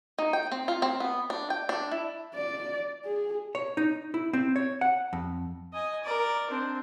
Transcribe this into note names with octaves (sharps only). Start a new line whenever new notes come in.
D#4
G5
C4
F4
C4
B3
D4
G5
D4
E4
D5
G#4
C#5
D#4
E4
C4
C#5
F#5
F2
D#5 G#5
A#4 D5
C4 D4